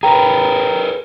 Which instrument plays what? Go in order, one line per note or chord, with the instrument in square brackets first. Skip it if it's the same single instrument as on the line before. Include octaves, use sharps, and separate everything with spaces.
[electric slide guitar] G#4 A#4 B4 [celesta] G5 A#5